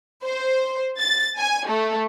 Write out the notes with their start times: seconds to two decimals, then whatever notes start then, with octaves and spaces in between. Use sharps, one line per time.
0.24 C5
0.98 A6
1.38 G#5
1.66 A3